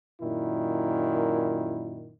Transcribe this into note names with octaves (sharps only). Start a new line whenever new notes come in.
F#2 A#2 D#3 E4